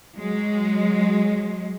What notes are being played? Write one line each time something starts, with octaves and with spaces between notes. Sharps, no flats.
F#3 G#3